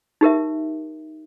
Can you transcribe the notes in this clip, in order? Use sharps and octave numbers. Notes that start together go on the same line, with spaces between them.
D#4 G4 A#4 E5